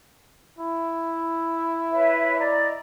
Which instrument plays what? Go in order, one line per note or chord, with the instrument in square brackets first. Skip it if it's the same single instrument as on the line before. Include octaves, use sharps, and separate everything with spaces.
[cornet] E4
[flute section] B4 C#5 E5
D5 D#5 A#5